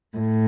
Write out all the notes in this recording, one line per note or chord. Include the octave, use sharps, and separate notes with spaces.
A2